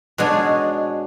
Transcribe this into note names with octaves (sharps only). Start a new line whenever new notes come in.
B2 G#3 D4 G#4 C#5